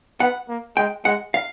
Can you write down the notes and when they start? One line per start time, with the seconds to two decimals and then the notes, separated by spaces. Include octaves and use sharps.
0.20 B3 F#5
0.49 A#3
0.77 G#3 G5
1.05 G#3 F#5
1.34 F5